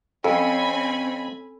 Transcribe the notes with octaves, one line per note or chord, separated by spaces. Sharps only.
F2 C4 C#4 A4 G#5 B5